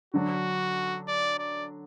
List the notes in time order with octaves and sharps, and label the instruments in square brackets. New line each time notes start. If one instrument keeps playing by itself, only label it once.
[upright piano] D3 F#3 D4 [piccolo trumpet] F#4
[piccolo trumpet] D5
D5